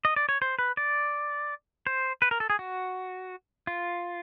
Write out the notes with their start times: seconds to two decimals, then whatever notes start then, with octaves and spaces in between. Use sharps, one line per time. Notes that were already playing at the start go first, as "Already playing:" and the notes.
0.05 D#5
0.16 D5
0.29 C#5
0.42 C5
0.59 B4
0.77 D5
1.87 C5
2.22 B4
2.31 A#4
2.40 A4
2.50 G#4
2.59 F#4
3.67 F4